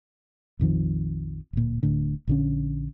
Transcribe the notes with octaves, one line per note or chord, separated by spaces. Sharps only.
A#1 F2 D#3 F3
D1 A#2
D1 A2 D3
A#1 D3 C#4